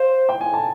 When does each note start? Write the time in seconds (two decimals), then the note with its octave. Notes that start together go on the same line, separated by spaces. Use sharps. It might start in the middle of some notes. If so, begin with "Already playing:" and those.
Already playing: C5 F5
0.29 G5
0.41 G#5
0.54 A5